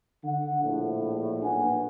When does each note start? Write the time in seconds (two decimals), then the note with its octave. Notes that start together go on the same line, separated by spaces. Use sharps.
0.24 D3 F#5
0.62 A#1 A2
1.43 B1 A#2 D4 B4 F#5 G#5